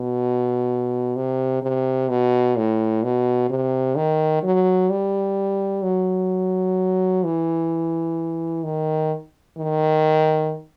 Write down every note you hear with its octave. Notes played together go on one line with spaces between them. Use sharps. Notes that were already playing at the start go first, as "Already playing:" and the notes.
Already playing: B2
C3
C3
B2
A2
B2
C3
D#3
F#3
G3
F#3
E3
D#3
D#3